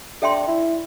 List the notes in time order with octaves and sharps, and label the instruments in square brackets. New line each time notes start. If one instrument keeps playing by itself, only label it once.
[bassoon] D4 [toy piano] A4 E5 G5 C6
[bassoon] E4